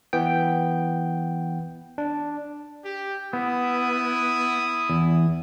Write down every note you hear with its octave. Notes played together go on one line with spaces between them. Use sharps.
E3 B3 G5
D4
G4
B3 E4 D#6
E2